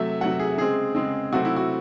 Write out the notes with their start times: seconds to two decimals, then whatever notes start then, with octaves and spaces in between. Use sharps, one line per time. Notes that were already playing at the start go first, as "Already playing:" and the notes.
Already playing: C3 F#3 A3 E5
0.21 C3 F#3 A3 F#5
0.39 G#4
0.58 C#3 G#3 C4 G#4
0.95 C#3 G#3 C4
1.32 C3 F#3 A3 C4 F#4
1.45 E4
1.56 F#4